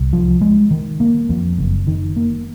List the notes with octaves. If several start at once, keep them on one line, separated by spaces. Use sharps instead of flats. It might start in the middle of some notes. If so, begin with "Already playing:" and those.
Already playing: C2
F3
G#3
D#3
A#3
F2
F#1
D#3
A#3